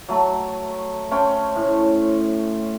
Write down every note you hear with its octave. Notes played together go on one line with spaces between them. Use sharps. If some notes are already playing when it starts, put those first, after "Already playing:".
F#3 A3
A3 C#4 C5 G5
A2